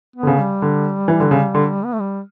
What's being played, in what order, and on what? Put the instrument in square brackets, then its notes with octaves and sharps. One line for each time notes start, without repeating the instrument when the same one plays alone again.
[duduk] B3
[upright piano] D3
C#3
[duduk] G3
[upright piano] D3
E3
D3
C#3
D3
[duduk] B3
A3
G3